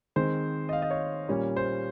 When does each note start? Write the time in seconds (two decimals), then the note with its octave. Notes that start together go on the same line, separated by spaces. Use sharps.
0.16 D#3 G#3 C4 C5
0.69 D#5
0.73 F5
0.82 D#5
0.91 C#5
1.29 A#2 G3 A#3 C#4
1.57 C5